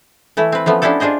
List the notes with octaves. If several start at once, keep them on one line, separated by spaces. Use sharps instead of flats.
E3 A3 E4
C4 B4
F3 A3 B3 C#4
B3 C#4 D4 E4 G4 A4
D4 F4 G#4 C5 D#5